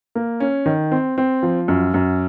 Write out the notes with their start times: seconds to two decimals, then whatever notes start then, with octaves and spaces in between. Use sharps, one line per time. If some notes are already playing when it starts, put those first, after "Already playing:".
0.15 A#3
0.40 C#4
0.66 D#3
0.92 C4
1.18 C4
1.43 F3
1.68 F#2
1.94 F#2